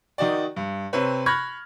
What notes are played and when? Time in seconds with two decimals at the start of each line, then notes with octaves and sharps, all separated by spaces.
0.18 D#3 D#4 F#4 D5
0.56 G2
0.93 C3 C4 B4 C#5
1.26 B5 C#6 F6 F#6 G#6 A#6